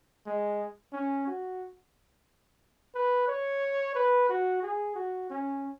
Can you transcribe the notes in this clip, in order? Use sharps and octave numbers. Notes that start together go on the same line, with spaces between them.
G#3
C#4
F#4
B4
C#5
B4
F#4
G#4
F#4
C#4